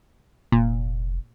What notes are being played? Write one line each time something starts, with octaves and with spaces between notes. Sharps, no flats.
F1 A#2